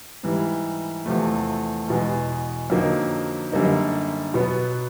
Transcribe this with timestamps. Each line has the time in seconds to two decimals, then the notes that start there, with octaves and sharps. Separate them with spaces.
0.23 G#2 E3 G3
1.06 E2 C3 F3 A3
1.88 E2 B2 G#3
2.70 F2 D3 F#3 A#3 D#4
3.52 F#2 D3 G3 A#3 D#4
4.34 B2 F#3 B3